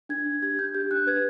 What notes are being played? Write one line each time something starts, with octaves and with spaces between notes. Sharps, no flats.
D4 G#6
D4
G4 G#6
D4 G6
G4 G6
D4 F#6
B4 G#6